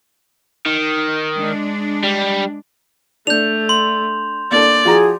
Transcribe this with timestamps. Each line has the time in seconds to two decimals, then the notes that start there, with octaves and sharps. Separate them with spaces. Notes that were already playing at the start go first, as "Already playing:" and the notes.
0.66 D#3
1.37 G#3 D4
2.03 G3
3.27 A3 D4 G6 F7
3.69 C6
4.51 A#3 D4 A4 D5
4.85 F3 F#4 G#4 A#5